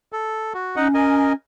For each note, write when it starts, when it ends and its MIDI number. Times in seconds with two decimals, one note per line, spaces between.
0.13 0.53 69
0.54 0.76 66
0.76 1.33 61
0.76 0.88 63
0.76 0.88 75
0.76 0.88 78
0.94 1.33 70
0.94 1.33 75
0.94 1.33 80